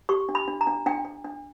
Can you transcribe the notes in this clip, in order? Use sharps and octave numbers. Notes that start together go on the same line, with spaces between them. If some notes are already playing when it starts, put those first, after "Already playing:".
G4 C#6
D4
B5
D4
A#5
D4
D4 G5
D4
D4